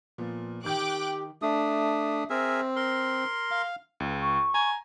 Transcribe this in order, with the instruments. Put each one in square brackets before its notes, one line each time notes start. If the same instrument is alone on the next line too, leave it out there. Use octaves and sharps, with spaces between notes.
[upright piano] A#2 F3 B3
[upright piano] D#3 G6 [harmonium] G4 [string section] G5 D6 F#6
[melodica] A3 D4 D#6
[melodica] C4 [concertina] G#4 A#4 E5
[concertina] A#4 C6
[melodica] F5
[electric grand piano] C#2
[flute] C#6
[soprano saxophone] G#5 [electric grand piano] A#5